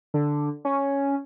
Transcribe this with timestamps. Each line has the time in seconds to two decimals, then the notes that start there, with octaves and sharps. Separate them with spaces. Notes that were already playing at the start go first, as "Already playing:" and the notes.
0.14 D3
0.65 C#4